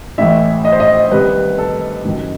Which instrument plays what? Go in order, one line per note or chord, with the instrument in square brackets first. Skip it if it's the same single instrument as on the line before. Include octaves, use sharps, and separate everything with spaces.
[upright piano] A1 A2 E3 E5
D#5
C5
D#5
C2 C3 D#3 B4
A4
F#1 F#2 D#3